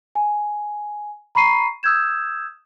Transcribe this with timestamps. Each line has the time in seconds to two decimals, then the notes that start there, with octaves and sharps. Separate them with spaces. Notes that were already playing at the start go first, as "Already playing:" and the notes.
0.15 G#5
1.35 A#5 B5 C#6 C7 D#7
1.83 D#6 E6 G6 G#6 E7